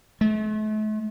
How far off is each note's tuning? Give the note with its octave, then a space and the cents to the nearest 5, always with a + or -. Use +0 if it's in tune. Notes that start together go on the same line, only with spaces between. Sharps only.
A3 -40